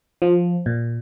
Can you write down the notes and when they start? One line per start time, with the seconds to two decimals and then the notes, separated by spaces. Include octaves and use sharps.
0.22 F3
0.66 A#2